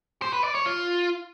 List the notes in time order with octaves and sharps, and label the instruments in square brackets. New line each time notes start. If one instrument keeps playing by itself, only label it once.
[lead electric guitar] C5
B4
D5
C#5
F4